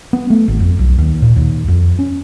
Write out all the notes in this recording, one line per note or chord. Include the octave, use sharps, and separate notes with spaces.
B3
A3
G#1
F2
B1
D#2
A#2
D#2
F2
C#4